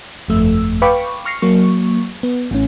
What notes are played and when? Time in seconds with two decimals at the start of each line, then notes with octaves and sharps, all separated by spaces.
0.28 G1 F2 A3 E6
0.82 B4 F5 G5 B5 C#6 D6
1.25 C#6 F6 A#6 C7 C#7
1.42 F#3 A#3 C#6
2.23 B3
2.51 A1 A2 C#4